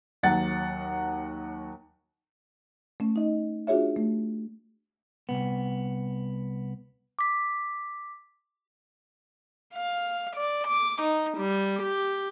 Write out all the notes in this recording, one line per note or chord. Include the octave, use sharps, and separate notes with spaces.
D#2 F#3 F#5 A6
A3 C#4
D#4 D#5
D4 F4 F#4 G#4 C#5 E5
A3
C2 B3
D6 B6
F5
D5
D6
D#4
G3
G4